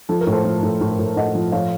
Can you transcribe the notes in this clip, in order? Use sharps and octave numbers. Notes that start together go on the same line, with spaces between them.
F3 A4
A#4
A2
A4 C5
F3
A2
A2
A2
A2 D#5 F#5
F3
F3 C#5 F5